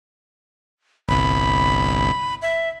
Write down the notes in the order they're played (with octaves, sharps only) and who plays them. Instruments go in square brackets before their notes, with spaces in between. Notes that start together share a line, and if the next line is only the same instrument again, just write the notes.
[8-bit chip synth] G1 C2 [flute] B5
[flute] E5